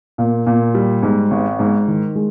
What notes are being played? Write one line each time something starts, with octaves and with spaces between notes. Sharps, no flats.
A#2
A#2
G3
G#2
G#1
G#2
D#3
G#3